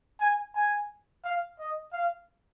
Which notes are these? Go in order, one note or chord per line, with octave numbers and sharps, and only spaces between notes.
G#5
G#5
F5
D#5
F5